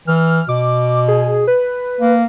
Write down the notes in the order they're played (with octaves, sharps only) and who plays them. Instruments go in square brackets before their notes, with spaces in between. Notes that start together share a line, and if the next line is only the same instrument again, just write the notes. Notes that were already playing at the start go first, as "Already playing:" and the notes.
[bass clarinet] E3 [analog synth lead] F6
[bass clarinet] B2 [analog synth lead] D6
[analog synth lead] G#4
B4
[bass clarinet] A#3